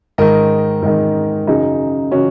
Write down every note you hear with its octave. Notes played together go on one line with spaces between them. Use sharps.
G#2 D#3 A#4 D#5
G#2 D#3
F#2 C#3 D#4 G#4
C#3 C#4 F#4